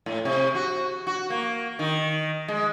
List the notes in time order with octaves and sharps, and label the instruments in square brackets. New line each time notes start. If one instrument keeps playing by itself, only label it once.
[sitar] A2
C3
F#4
F#4
A#3
D#3
G#3